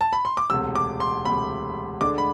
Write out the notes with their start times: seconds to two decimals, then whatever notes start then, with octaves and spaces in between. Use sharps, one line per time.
0.01 A5
0.13 B5
0.25 C6
0.37 D6
0.50 E1 D2 C3 E6
0.75 D6
1.00 C6
1.25 E1 D2 C3 B5
2.01 D2 D3 G#3 D4 D6
2.18 B5